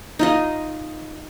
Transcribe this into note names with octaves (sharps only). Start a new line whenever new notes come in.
D#4 F4 D#5